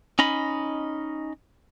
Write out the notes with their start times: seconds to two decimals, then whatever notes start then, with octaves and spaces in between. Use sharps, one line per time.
0.19 C#4 D#4 D#5 B5